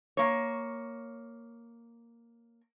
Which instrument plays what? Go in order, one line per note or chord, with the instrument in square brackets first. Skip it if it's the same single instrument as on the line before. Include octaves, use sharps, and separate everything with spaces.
[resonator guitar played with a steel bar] A#3 C#5